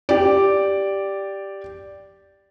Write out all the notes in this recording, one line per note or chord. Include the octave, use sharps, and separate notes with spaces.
G4 D5